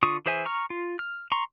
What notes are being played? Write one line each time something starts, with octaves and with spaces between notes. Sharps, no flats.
D3 F4 C#6 D#6
E3 G#4 C5 E5 G#5
A#5 C#6 F6
F4
F6
A#5 C6 C#6